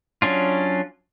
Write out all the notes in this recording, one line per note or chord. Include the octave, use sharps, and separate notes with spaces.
F#3 C#4 D4 F4